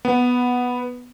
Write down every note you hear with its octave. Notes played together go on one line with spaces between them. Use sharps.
B3